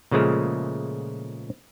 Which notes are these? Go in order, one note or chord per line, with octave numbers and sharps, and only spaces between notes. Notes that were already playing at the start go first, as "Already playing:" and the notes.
A#2 C#3 F3 G#3 A3